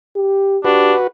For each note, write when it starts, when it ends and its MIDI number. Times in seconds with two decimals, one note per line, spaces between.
0.16 0.58 67
0.65 0.94 62
0.65 1.07 66
0.65 0.95 67
0.65 1.07 71